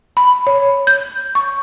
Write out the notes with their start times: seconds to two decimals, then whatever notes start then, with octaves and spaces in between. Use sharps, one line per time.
0.17 B5
0.47 C#5
0.87 G6
1.35 C#6